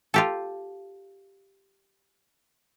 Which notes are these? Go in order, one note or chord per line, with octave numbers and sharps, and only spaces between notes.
F4 G4 A4